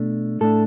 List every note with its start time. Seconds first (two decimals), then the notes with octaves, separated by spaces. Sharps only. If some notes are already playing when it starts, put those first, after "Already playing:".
Already playing: B2 A3 D4
0.41 A2 A3 D4 A4